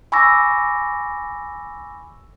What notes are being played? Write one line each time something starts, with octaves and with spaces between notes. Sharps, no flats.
G#5 B5 C#6 D6 E6 A#6